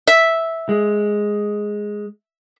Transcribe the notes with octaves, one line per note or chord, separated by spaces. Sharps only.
E5
G#3